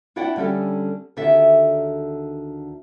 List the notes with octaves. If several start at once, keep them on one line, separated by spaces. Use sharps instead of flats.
D4 E4 F#4 D5 F#5 G5
D3 G3 C#4 G4 A4
D2 D3 D#3 G4 A4 E5